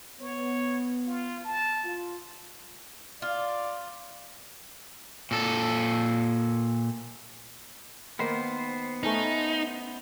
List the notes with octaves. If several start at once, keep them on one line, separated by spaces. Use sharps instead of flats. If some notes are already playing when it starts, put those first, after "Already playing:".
B3 C#5
F4
A5
F4
F4 D5
A#2 A4
D#3 A#3 B3 C5
A3 C#4 D#4 B4